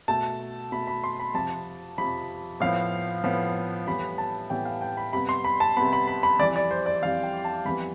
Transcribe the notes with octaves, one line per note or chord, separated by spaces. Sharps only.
B2 A3 A5
B2 A3 B5
B5
C6
B5
F2 C3 F3 A5
F2 C3 F3 B5
A2 F3 B3 F5
A2 F3 B3
A2 E3 G3 B3 B5
A5
A2 E3 G3 B3 G5
F5
G5
B5
C3 G3 B3 B5
C6
B5
A5
C3 G3 B3 B5
B5
B5
B5
F2 E3 G3 D5
D5
C5
D5
F2 E3 G3 F5
G5
A5
F2 E3 G3 B3 B5